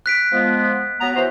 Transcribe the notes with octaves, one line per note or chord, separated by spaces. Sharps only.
F#6 B6 D7
F3 G#3 B3
F#3 B3 A#5
E3 F#4 C5